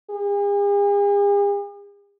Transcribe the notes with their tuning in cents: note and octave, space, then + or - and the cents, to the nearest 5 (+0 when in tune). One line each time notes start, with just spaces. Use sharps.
G#4 -45